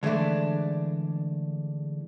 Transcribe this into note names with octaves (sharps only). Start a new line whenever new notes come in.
D3 E3 G#3 A3 D4